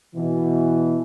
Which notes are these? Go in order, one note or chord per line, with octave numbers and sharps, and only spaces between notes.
B2 E3